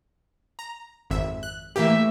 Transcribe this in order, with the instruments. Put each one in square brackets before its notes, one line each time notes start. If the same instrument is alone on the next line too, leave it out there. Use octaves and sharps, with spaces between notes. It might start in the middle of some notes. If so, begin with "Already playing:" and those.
[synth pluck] A#5
G#1 F2 E5
F#6
[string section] A2 E5 [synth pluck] E3 A#3 G4